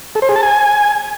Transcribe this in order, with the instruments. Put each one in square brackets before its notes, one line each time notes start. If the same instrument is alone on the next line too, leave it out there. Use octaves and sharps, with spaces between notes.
[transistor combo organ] A4
C5
G#4
A5
G#5